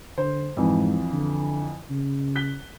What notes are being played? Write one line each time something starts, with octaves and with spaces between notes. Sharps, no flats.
D3 C5
F2 G#2 E3
D3
C#3
F#6 B6 G7